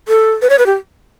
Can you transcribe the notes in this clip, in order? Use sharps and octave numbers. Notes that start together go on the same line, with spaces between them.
A4
B4
C#5
B4
G4